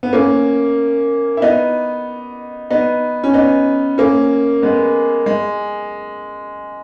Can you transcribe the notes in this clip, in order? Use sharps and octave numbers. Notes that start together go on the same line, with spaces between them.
B3
A#3 C#4
E4
B3 D#4
B3 D#4
C#4
B3 D#4
A#3 C#4
G#3 B3
G#3